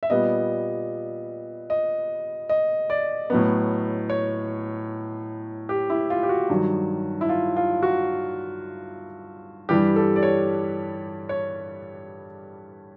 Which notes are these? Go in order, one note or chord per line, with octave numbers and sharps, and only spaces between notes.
E5
A#2 G3 B3 D#5
D#5
D#5
D5
A2 F#3 B3
C#5
G4
E4
F4
G4
F#4
G2 D#3 F#3
E4
F4
F4
F#4
G2 E3 G3 G4
A4
D5
C#5
C#5